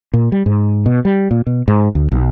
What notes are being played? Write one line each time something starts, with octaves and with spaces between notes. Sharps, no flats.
A#2
G3
G#2
B2
G3
A#2
B2
G#2
D2
B1